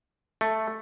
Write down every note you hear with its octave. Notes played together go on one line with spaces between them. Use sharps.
A3